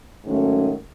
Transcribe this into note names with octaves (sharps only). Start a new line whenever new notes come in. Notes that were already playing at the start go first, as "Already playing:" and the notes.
G#2 D#3 F#3 A3 C#4